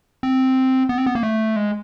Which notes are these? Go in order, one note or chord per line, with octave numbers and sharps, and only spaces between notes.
C4
B3
C4
B3
A#3
A3
G#3